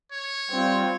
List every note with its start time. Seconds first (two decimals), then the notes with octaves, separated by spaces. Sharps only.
0.12 C#5
0.50 G3 C4 F4